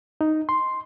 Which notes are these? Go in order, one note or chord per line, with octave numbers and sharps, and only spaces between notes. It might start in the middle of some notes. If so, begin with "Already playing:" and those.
D#4
C6